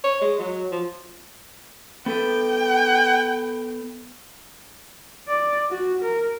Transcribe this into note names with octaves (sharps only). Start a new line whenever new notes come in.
C#5
G#3
F#3
F3
B3 A4 B4 G5
D5
F#4
A#4